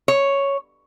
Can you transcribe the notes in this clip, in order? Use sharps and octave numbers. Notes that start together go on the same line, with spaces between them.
C#5